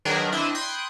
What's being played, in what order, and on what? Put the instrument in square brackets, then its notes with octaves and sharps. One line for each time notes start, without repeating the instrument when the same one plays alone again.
[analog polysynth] D#3 F#3 D4 G#4 A#4 B4
C4 D4 E4 D#5 E5
G5 B5 C6 D#6 F#6 G#6